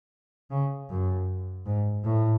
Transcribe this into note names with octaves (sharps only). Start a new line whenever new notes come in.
C#3
F#2
G#2
A2